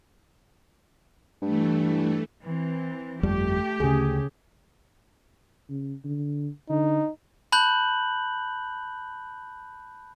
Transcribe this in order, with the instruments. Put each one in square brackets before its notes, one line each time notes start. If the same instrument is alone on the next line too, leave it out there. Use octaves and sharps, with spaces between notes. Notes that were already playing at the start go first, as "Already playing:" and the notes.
[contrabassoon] G2 [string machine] E3 A3
[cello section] E3 C4
[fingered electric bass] G1 F2 G3 [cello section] A3 G4
[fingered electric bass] D2 [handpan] C#3 G#4
[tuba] C#3
D3
[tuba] D3 [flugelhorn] D#4
[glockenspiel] A5 B5 F#6 G6 F#7